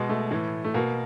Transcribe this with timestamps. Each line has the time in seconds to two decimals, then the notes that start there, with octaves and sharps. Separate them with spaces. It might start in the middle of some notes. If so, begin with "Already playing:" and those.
Already playing: B2 G#3
0.09 A3
0.31 A2 E3
0.64 A3
0.74 B2 A#3